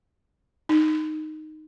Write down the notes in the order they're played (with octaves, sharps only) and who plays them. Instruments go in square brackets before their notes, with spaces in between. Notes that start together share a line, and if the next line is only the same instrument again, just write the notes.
[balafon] D#4